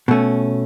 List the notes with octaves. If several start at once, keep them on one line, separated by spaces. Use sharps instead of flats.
B2 A3 C#4